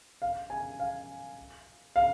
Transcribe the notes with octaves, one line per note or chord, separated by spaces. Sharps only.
F5
G#5
F5
F5